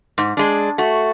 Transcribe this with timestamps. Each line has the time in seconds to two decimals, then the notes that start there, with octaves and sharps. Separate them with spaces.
0.18 G#2
0.37 G#3 D4
0.78 A3 F#4